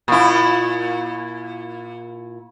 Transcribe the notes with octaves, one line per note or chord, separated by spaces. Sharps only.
A#2 E4